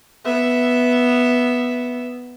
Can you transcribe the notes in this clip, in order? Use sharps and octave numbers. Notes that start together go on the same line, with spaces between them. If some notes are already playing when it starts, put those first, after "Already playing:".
B3 E5